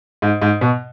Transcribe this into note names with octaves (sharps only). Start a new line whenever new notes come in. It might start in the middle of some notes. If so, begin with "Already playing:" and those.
G#2
G#2
B2